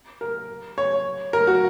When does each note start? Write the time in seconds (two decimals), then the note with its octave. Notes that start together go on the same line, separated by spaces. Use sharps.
0.21 A#4
0.78 C#5
1.33 A#4
1.47 F#4